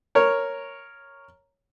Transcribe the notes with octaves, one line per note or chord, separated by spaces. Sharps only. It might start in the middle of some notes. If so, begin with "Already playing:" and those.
A#4 C#5